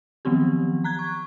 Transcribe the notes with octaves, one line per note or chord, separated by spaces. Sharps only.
D#3 F3 F#3 B3 C4 G4
A#5 F#6 G#6
C#6